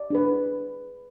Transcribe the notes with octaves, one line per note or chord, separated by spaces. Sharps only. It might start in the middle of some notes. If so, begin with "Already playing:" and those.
Already playing: D5
D4 G#4 B4